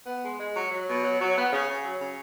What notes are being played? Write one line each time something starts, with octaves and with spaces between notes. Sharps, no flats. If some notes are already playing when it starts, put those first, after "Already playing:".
B3
G#3
G#3
F#3
F#3
B2
F#3
F#3
B3
C#3
C#3
F#3
C#3